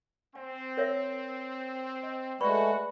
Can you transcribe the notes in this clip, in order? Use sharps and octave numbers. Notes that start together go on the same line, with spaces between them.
C4 G#5
A#4 C#5 E5
D#5
G#3 A3 F#4 B4 D5 B5 C#6